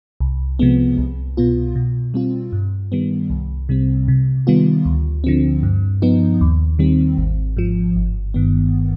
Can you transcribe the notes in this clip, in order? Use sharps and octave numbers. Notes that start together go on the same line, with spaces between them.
C2
C3 F3 G#3 B3
C2
B2 B3 F4
B2
G3 C4 F4
G2
D#3 G3 B3
C2
C3 G3 C4
C3
D#3 G3 B3 F4
D2
D3 F3 C4
G2
F3 B3 D#4
D#2
D#3 G3 C4
G#1
G#2 F3
G1
G2 D#3 B3